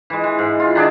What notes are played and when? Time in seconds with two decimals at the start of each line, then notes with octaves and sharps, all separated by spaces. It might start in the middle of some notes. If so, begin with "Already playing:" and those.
0.10 E3 G#3
0.24 E3
0.39 G#2
0.60 F4
0.75 D#3 D4 G#4 D5